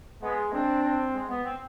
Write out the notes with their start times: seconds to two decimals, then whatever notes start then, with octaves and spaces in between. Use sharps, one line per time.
0.23 G#3 B3
0.53 C4 D4
0.84 C4
1.13 G#3
1.29 B3
1.44 C4